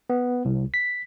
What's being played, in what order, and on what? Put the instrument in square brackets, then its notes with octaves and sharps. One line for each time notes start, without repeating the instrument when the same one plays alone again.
[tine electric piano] B3
C2
B6